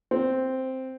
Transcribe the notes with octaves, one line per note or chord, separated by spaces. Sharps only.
C4